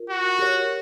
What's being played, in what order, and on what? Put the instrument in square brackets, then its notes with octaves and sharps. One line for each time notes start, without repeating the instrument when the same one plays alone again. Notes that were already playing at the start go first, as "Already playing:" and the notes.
Already playing: [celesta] F4 A#4
[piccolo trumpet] F#4
[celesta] G4 A#4 C#5